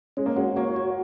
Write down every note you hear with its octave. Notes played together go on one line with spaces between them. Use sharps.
G#3 C#4
A#3
G#3 F#4
A#3 C#5
F#4